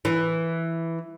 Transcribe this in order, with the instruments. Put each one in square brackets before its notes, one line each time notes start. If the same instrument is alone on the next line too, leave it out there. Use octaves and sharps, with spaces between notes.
[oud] E3